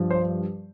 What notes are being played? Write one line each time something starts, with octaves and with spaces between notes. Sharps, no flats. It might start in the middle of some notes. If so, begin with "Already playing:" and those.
Already playing: G2 F3
C5